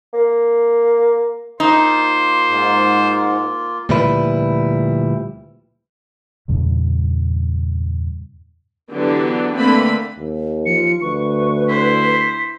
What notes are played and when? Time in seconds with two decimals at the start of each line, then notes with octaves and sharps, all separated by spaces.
0.14 A#3
1.60 A#3 D#4 F4 C5
2.48 G#2
3.89 D2 A#2 F3 G3 E4 B4
6.48 E2 G2 A#2 C#3
8.93 D3 E3 F#3 B3 D4 G4
9.56 D3 A3 A#3 C4 B4 B5
10.18 D#2
10.66 F3 C#7
11.02 D2 B4 C#6
11.68 E4 C5 B6